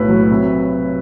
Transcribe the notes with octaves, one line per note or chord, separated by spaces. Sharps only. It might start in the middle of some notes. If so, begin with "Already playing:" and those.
Already playing: B1 A2 B4
F#3
C3